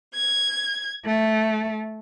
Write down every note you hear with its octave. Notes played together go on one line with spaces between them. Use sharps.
G#6
A3